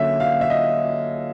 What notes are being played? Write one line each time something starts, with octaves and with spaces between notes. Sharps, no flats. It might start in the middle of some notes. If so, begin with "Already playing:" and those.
Already playing: D3 F#3 A#3 C#4 E5
F5
E5
D#5